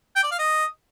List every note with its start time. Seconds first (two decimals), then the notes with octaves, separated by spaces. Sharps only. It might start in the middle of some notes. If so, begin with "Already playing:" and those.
0.16 G5
0.24 D5
0.31 F5
0.39 D#5